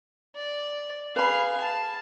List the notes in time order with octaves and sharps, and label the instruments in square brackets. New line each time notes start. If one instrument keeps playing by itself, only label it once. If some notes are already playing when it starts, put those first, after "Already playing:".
[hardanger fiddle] D5
[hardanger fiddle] G#4 F5 [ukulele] B4 B5
[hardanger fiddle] A5